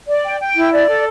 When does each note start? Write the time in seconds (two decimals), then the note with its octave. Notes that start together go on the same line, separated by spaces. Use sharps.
0.07 D5
0.24 G5
0.39 G5
0.56 E4
0.72 D5
0.87 A4